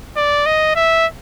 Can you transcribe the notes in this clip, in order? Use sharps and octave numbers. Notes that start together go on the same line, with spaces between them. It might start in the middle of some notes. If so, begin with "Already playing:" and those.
D5
D#5
E5